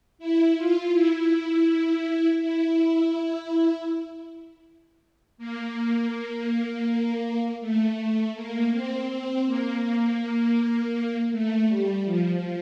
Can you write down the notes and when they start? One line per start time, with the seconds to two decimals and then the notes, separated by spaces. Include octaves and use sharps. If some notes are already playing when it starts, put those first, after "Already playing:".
0.19 E4
0.56 F4
0.93 E4
2.41 E4
5.38 A#3
7.60 A3
8.35 A#3
8.71 C4
9.08 C4
9.46 A#3
11.32 A3
11.68 G3
12.05 F3